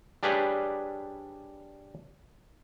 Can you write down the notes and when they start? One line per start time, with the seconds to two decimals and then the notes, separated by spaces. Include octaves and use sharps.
0.23 G3 D4 G4 G#4 B4 C#5